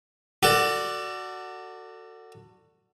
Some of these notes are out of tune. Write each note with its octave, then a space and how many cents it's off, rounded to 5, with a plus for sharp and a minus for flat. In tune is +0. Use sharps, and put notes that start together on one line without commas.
F#4 +0 A4 +30 D5 +0